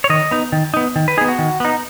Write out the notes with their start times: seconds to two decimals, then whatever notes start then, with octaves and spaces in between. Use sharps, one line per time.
0.04 C#5
0.10 D#3 D#5
0.31 B3 D#4
0.52 D#3
0.74 B3 D#4
0.96 D#3
1.08 B4
1.17 D#4 G#4
1.21 B3
1.28 F#4
1.39 D#3
1.60 B3 D#4